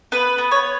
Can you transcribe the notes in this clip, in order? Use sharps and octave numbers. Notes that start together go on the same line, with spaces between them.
B3 B4
B3
C#5